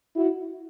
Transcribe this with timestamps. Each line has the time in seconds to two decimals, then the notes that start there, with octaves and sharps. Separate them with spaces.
0.16 E4 F#4